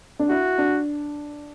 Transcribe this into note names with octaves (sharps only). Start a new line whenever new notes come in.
D4
E4 F#4
D4